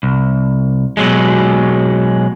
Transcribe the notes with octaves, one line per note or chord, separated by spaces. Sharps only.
C2
B2 F#3 G#3